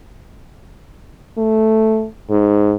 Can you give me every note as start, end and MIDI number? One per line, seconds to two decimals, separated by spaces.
1.38 2.07 57
2.30 2.75 44